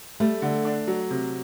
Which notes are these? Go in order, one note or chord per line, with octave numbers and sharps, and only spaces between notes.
G3 A3
D3
D4
F#3
C3